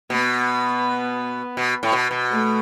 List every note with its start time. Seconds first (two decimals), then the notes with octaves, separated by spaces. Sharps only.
0.10 B2 B3
1.57 B2
1.83 A2
1.92 B2
2.11 B2
2.30 A3